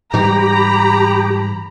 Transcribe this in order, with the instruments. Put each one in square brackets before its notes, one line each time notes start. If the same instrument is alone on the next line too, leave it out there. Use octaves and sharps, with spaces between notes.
[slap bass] G#2 E3 G3 [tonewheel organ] G4 [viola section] A#5 B5